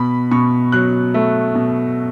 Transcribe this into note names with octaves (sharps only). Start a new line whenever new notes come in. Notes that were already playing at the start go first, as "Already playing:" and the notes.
Already playing: B2 B5
B2 C#6
F#3 F#6
A3
B2